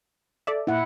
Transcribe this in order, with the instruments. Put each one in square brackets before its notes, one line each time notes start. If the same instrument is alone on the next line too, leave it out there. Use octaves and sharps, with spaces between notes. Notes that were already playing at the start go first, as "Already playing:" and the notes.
[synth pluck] A4 D5 E5
[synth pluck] A#2 [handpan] E4 F#5